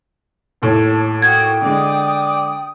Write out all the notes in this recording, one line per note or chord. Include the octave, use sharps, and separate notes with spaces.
D#2 A2 C#5 A5
F#4 G5 D#6 G#6
D3 G#3 D5